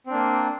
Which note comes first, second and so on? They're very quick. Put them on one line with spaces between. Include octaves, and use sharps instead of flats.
C4 D4 A#3